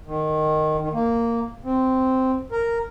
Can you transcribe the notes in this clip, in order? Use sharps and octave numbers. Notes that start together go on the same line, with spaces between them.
D#3
D#3
A#3
C4
A#4